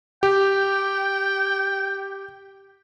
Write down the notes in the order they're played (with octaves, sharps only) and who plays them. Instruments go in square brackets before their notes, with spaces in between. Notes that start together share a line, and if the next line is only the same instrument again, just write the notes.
[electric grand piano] G4 [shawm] G5